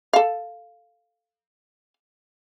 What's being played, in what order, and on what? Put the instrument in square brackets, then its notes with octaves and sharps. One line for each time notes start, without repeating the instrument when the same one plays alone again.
[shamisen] A4 F5